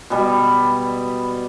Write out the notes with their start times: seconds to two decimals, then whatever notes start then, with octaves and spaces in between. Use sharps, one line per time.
0.10 B2 G3